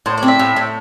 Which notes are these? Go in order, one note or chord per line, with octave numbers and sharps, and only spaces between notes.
A2 C5
D5
C4
E5
A2
A2